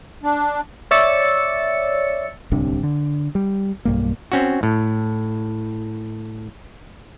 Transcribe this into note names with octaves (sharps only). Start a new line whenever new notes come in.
D4
C#5 D5 E5 E6 A6 C#7
D1 C2 C3 D4
D3
G3
B1 G2 A#3
C4 C#4 F#4
A2